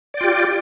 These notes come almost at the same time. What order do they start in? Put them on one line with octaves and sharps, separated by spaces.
D5 G5 F4 G4